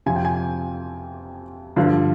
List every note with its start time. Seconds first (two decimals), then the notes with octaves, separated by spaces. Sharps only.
0.06 F2 C3 F3 G#5
0.16 G5
0.25 G#5
1.76 G2 D3 F3